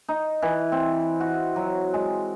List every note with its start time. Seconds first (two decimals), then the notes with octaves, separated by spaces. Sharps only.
0.09 D#4
0.42 E3
0.72 C4
1.20 F#4
1.56 F#3
1.94 G#3